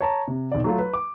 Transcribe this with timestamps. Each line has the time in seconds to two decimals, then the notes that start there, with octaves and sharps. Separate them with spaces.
0.01 C#5 A5 A#5
0.28 C3
0.52 B1 D5
0.64 F#3 A3 F4
0.78 B4
0.93 D6